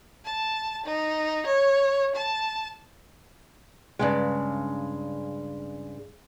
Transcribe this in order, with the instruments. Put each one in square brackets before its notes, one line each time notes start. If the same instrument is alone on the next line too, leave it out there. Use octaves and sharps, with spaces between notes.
[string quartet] A5
D#4
C#5
A5
[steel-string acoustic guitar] G2 C#3 G#3